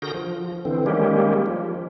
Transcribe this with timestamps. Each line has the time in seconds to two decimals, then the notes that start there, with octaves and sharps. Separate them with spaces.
0.02 D3 F#4 G#4 A#4 G6 A#6
0.14 F3
0.65 D3 E3 C4
0.86 D#3 G3 G#3 A#3 C#4 G4
1.46 F3